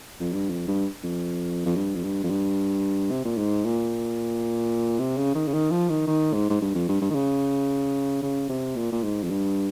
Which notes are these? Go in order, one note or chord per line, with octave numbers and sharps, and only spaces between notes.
F2
G2
F2
G2
F2
F2
G2
F2
G2
F2
G2
C3
A#2
G#2
A#2
C3
C#3
D#3
C#3
D#3
F3
D#3
D#3
G#2
G#2
G2
F2
G2
G2
D#3
C#3
C#3
C3
A#2
A#2
G#2
F2
G2